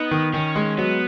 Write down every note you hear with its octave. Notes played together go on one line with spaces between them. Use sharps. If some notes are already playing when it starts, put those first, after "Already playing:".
Already playing: B3 D#4
D#3
D#3 C#4
G#3
F#3 B3